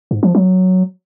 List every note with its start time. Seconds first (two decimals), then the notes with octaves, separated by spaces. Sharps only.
0.11 G#2
0.23 F3
0.35 F#3